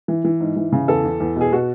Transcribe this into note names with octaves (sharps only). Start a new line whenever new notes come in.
E3
E3
G#2
E3
C#3
E2 A4
E2
E2
B2 G#4
B2 F#4